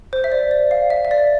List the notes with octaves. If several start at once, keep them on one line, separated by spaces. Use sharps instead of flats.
C5
E5
D5
D5
F5
E5
E5
D5